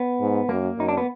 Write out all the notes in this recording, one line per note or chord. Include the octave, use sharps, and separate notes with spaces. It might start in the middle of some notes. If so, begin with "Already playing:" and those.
Already playing: B3
G#2
F#2 A#3
F#2 D#4
D4
B3